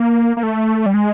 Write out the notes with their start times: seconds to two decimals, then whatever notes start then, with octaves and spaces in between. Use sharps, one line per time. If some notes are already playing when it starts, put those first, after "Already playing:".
Already playing: A#3
0.37 A#3
0.43 A3
0.86 G3
0.94 G#3